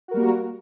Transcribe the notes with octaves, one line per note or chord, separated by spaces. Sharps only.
G3 A#3 F#4 A#4